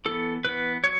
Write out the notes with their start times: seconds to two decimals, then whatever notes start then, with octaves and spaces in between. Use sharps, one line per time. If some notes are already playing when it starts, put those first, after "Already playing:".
0.05 E3 B3 A4
0.45 E3 B3 B4
0.84 F#3 C#5